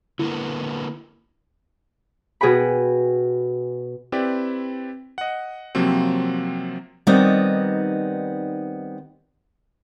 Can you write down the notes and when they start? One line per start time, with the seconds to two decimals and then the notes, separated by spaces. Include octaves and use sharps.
0.19 D3 A#3 B3 E4
2.41 B2 G#4 F#5 G5 B5
4.12 C4 E4 G4 B4 D5
5.18 D#5 F#5
5.75 C3 F3 F#3 A#3 C4
7.07 D#3 G3 B3 C4 D#4